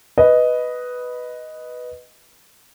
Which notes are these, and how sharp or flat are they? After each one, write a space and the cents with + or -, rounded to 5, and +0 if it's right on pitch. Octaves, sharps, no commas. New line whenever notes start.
B4 +0 D#5 +0